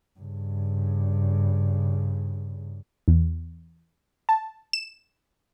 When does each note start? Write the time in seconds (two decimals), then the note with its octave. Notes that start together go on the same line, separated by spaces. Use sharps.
0.20 G2 C#3
3.08 E2
4.29 A5
4.73 E7